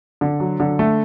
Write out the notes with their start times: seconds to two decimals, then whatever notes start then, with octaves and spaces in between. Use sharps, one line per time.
0.21 D3
0.40 F#3
0.60 D3
0.79 A3